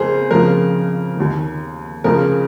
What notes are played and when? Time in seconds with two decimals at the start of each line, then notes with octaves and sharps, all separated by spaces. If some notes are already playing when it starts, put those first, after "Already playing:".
Already playing: F2 C#3 F3 G#4 A#4 C5
0.31 F2 C#3 F3 A#4
1.17 D#2 D#3
2.04 F2 C#3 F3 A#4